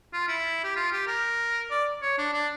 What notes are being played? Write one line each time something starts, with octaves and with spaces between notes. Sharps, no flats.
F4
E4
G4
F4
G4
A#4
D5
C#5
D4
D4